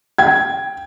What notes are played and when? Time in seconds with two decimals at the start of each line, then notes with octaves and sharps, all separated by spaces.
0.18 G5 G#6